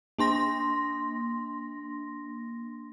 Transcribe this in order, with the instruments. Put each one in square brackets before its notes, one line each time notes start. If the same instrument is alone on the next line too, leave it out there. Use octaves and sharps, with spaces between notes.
[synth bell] A#3 D4 C6 A#6